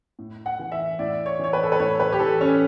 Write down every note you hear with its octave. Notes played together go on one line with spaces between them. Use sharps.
A2
F#5
E3
E5
A2 D5
C#5
E3 C#5
B4
A4
B4
A2 C#5
B4
G4
E3 A4
C#4